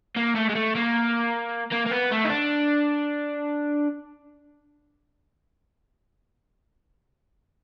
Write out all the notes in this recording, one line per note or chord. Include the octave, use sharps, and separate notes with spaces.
A#3
A3
G#3
A3
A#3
A#3
A#3
B3
A3
D#4
D4